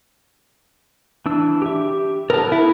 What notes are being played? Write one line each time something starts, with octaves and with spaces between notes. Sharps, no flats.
E3 D4 E6
G4 E5
B3 A4 A#4 A5
E4